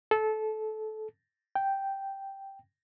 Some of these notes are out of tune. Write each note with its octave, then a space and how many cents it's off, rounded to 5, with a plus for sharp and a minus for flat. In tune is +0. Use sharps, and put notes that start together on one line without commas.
A4 -20
G5 -5